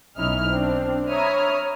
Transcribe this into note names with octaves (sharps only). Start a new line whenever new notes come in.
B1 C#4 D#4 E4 F6
C4 D4
C#5 E5 A#5 B5 D#6 F6